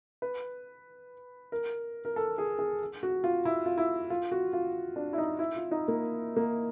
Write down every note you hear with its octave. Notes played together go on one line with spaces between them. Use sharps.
B4
A#4
A#4
A4
G#4
G#4
F#4
F4
E4
F4
E4
F4
F#4
F4
D4
E4
D#4
E4
F4
D#4
A#3
A#3